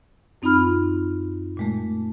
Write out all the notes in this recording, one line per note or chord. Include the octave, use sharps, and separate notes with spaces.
F#2 C4 D#4 F4 B5 F6
A#2 G#3 A3